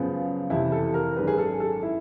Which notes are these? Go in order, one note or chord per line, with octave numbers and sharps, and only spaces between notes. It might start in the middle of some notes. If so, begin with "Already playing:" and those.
Already playing: F#2 C#3 F3 G#3 B3
F2 C3 E3 E4
A4
A#4
G#1 F#2 D#3 G#3 B4
G#4
A4
A4
E4